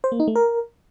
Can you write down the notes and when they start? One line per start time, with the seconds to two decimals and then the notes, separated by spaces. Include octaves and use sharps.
0.04 C5
0.12 A#3
0.20 D#4
0.28 A3
0.35 A#4